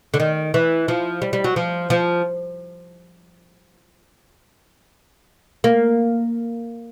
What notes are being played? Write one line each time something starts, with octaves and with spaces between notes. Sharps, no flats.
D3
D#3
E3
F3
G3
G3
F#3
F3
F3
A#3